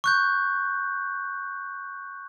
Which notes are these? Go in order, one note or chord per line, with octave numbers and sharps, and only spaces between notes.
C#6 F#6 G6